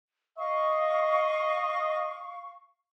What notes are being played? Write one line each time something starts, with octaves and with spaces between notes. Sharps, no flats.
D#5 F5 C#6